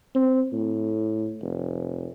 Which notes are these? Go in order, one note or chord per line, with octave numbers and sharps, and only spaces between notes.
C4
A2
F1